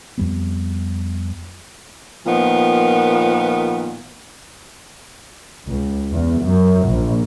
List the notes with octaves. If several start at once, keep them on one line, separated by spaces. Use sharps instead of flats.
F2 G3 B3
A#2 D#3 F3 B3
C#2
E2
F#2
A#1